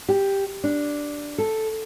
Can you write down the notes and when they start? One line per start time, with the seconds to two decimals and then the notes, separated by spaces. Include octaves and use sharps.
0.09 G4
0.64 D4
1.38 A4